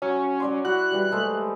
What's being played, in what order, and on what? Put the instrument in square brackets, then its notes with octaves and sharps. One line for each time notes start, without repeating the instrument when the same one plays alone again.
[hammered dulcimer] F#3 [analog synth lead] C#4
[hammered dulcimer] F#3 D5 C6
[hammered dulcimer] E4 F#4 [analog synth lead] F#6
[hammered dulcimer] E3 G3
G#3 A3 C5